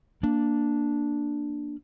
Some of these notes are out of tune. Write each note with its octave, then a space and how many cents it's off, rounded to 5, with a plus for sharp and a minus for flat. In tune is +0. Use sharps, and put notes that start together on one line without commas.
A#3 +0 D4 +0